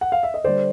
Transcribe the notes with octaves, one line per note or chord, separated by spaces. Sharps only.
F#5
F5
E5
D#5
D3 G3 C5 D5